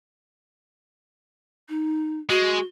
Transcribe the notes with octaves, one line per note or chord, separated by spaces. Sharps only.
D#4
G#3 F#4